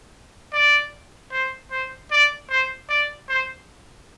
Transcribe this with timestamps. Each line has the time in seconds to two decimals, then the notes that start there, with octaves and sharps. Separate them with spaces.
0.53 D5
1.32 C5
1.71 C5
2.11 D5
2.50 C5
2.89 D5
3.29 C5